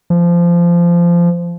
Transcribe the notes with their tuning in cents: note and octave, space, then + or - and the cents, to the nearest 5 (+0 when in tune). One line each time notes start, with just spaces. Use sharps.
F3 -20